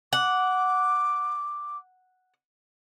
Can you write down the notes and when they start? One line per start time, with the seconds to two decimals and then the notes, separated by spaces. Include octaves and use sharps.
0.13 F#5 D6